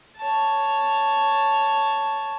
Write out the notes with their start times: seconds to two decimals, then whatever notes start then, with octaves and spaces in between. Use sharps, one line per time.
0.17 C#5 A5